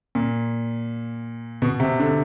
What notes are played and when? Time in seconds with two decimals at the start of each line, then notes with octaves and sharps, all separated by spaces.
0.15 A#2
1.62 B2
1.80 C3
1.99 D3